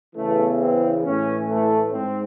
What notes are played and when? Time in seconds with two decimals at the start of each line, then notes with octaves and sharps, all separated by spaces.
0.16 E2 C#3 E3 A3
0.60 C4
1.04 A2 E3 C#4
1.49 A3
1.93 G#2 C4